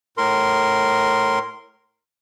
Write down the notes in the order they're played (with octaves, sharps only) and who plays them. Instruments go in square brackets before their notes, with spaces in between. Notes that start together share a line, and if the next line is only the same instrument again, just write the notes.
[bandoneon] A2 A#4 C6